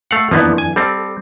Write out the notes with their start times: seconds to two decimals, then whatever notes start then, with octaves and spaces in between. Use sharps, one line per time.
0.11 A3 F5 F#5
0.31 F2 E3 F3 A#3 B3 D4
0.58 G#5
0.76 G3 C4 A4